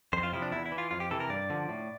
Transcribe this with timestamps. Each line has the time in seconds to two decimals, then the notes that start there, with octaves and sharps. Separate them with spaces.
0.13 F2 C5
0.23 F4
0.33 C3 F3 E4
0.42 D4
0.52 E2 E4
0.66 E4
0.72 E3
0.78 F4
0.91 F2 F4
1.00 G4
1.11 C3 E3 A4
1.20 A#4
1.29 G2 D5
1.50 D3 F3
1.69 A2